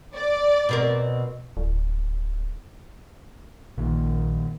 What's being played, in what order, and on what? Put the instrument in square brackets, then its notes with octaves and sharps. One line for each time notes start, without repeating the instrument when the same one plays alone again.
[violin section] D5
[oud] B2 C4 A#4
[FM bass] D1
[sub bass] A#1 [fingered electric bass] A#2 D#3 A#3